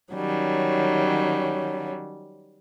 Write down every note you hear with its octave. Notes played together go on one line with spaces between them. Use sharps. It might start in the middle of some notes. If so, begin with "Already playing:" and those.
D#3 F#3 G3 C#4